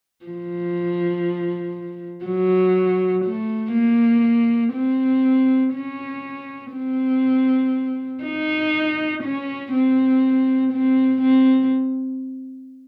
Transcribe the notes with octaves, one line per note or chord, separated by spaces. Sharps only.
F3
F#3
A3
A#3
C4
C#4
C4
D#4
C#4
C4
C4
C4